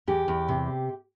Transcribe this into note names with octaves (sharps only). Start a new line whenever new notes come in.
E2 G4
E2
C3